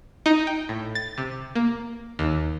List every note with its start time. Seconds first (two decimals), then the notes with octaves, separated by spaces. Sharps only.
0.26 D#4
0.47 G5
0.69 A2
0.95 A6
1.18 C3
1.55 A#3
2.19 D#2